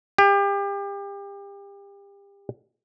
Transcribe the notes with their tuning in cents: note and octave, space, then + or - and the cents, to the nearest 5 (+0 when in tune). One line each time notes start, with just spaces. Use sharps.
G4 +30